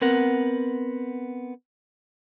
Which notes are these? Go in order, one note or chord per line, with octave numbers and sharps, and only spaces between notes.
B3 C4 A#4 F#5